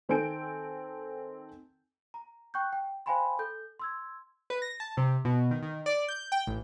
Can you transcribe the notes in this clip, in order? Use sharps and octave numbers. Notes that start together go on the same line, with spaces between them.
D#3 C4 A4 G#5 G6 D7
A#5
G5 C#6 F#6 G6
G5
C5 F5 G5 G#5 B5 C6
A4 G6
C6 E6 G#6
B4
A#6
A5
C3
B2
D#3
D#3
D5
G6
G5
A1